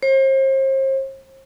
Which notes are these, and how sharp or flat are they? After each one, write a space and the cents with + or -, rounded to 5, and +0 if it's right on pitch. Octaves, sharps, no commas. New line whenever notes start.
C5 +40